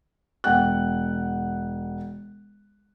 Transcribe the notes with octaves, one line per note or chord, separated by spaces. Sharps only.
E1 F#5 G5 F#6